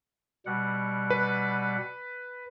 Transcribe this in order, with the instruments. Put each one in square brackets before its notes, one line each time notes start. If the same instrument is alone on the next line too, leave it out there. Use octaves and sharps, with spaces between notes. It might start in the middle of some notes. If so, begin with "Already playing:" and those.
[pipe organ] B2 G3 F#5
[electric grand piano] B4